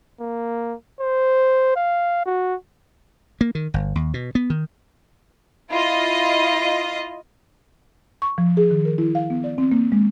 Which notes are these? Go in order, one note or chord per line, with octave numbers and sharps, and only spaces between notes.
A#3
C5
F5
F#4
A#3
D#3
G1
D#2
B2
B3
D#3
E4 F4 D#5
C#6
F3
G#4
D#3
A#4
E4
F5
B3
D5
C4
A#3
G#3